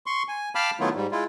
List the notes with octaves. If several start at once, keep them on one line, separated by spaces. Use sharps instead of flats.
C6 C#6
G#5
F5 G5 A5 B5 D6 F6
D#3 F#3 A3 B3 E4 F4
G#2 G3
G#3 E4 F4